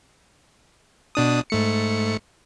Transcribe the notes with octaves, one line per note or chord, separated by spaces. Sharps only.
B2 D4 D#6
G#2 A3 C#7